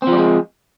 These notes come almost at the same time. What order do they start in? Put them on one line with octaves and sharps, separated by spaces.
C4 F3 G3 G#3